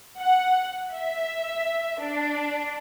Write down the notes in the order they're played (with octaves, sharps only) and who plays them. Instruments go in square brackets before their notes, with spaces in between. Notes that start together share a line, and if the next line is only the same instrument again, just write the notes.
[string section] F#5
E5
D4